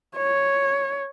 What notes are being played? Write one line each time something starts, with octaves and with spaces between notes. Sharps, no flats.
C#5